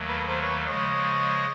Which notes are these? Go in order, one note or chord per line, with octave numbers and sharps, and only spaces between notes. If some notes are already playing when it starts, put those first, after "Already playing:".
Already playing: D#2 D#3 F#3 A3
A4 B4
B4
A#4 C5
B4 C#5
C#3 F3 G#3 C#5 D#5